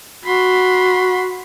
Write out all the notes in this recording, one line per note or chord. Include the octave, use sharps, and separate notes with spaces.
F#4 B5 C6